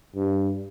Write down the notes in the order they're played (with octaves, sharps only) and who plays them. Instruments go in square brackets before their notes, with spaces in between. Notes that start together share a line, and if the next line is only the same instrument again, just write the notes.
[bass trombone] G2